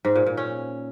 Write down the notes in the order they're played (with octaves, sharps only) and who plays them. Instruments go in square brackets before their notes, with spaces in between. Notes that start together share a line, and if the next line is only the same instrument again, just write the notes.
[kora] G#2
A#2
A#2
C#4